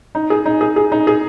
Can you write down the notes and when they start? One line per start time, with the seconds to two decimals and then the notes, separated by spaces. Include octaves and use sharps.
0.15 D#4
0.30 G#4
0.46 D#4
0.61 G#4
0.76 G#4
0.92 D#4
1.07 G#4